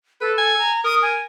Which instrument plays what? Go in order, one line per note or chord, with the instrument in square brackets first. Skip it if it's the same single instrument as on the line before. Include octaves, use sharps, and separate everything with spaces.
[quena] A4 [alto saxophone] B4
[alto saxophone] G#5
[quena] A#5
[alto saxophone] A#4 [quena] D#6
[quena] G#5